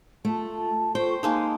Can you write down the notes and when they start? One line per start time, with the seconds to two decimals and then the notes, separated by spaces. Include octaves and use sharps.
0.25 A3 F4 A5
0.95 F4 A4 C5 G5 C#6
1.23 G#3 A#3 D#4 A5